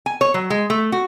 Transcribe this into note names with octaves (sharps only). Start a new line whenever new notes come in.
G#5
C#5
F#3
G#3
A3
F#4